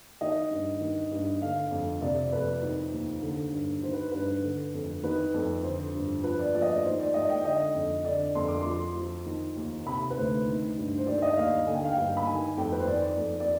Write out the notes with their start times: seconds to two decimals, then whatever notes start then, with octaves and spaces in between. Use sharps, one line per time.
0.21 D#3 D#5
0.51 G2
0.81 D#3
1.11 G2
1.42 D3 F5
1.71 F2
2.01 C3 D5
2.32 F2 B4
2.62 D#3
2.92 D#2
3.22 D3
3.52 G2
3.83 D#3 C5
3.93 B4
4.11 G2 B4
4.43 D3
4.74 F2
5.03 D#3 B4
5.34 F2
5.63 D3 C5
5.94 G2
6.24 F3 B4
6.40 D5
6.55 F3 D5
6.62 D#5
6.69 D5
6.84 D#3 C5
6.99 D5
7.14 G#2 D#5
7.30 G5
7.45 D3 D#5
7.74 F2
8.05 D3 D5
8.35 F2 C6
8.48 D6
8.61 F3 C6
8.95 F3
9.26 D#3
9.55 D#2
9.86 C3 B5
10.10 B4
10.17 D2 C5
10.47 D#3
10.77 G2
10.98 C5
11.06 D#3 D5
11.18 D5
11.22 D#5
11.37 D#2 F5
11.67 D3 G#5
11.75 G5
11.84 F5
11.92 G2 G5
12.17 B5
12.27 D#3 G#5
12.57 F2 G5
12.72 B4
12.79 C5
12.87 D#3 D5
13.17 F2
13.40 D5